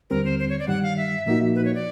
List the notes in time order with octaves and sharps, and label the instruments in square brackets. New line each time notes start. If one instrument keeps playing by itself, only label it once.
[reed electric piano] D#2 D3 G3 C4 [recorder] A#4
[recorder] C5
C5
C#5
D5
[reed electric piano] G2 D#3 G3 [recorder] F#5
[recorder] F5
E5
[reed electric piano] A#2 F3 A#3 D#4 F#4 [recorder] E5
[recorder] B4
C#5
D5